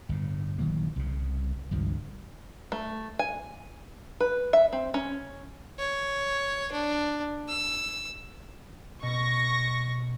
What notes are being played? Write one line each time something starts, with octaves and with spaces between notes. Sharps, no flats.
G1 A2
A#1 D#3 F#3 A#3
C2 C#3
G#1 C#2 G2 F3
A3
G#5
B4
E5
C4
C#4
C#5
D4
E6
B2 C#6 A#6